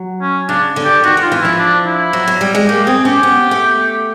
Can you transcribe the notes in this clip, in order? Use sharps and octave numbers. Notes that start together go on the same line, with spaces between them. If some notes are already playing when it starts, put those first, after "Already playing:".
Already playing: F#3
C#4
C#3 D4
D3
G4
D#3 F#4
E3 F4
E3
F3 E4
D4
E4
F#3
F#3
G3
G#3
A#3 G4
C4 G#4
C#4 G4
B3
A3